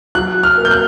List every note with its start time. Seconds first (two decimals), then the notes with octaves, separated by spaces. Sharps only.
0.15 F#3 F#6
0.43 F6
0.57 A#3
0.65 G6
0.71 F#6